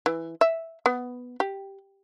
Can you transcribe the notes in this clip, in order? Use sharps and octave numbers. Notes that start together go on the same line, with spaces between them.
E3
E5
B3
G4